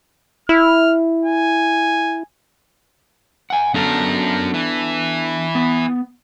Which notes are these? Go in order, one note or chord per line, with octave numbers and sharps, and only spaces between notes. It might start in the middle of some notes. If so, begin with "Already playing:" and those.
E4 F6
G#5
F#5 G#5
F#2 B3 D4 A4 A#4
E3
B3